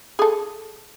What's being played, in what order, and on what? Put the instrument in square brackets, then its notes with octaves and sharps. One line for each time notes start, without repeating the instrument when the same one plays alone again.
[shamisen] G#4 A4